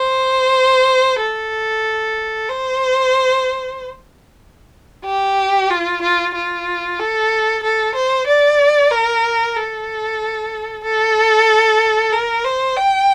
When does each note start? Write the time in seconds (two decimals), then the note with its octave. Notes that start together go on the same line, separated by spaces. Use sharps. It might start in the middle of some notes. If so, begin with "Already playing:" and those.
Already playing: C5
1.21 A4
2.49 C5
5.06 G4
5.70 F4
6.02 F4
6.35 F4
6.99 A4
7.63 A4
7.95 C5
8.27 D5
8.91 A#4
9.56 A4
10.84 A4
12.13 A#4
12.44 C5
12.77 G5